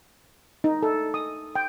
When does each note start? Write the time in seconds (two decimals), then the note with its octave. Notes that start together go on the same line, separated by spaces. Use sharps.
0.64 D#4
0.83 A4
1.14 D#6
1.55 G5